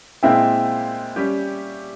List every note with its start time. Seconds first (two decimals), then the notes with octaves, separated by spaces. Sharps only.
0.23 A#2 G#3 C4 E4 E5 G5
1.16 G3 C#4 G4